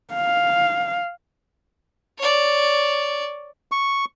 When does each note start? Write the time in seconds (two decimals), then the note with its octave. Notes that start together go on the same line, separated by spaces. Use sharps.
0.14 F5
2.18 C#5 D5
3.72 C#6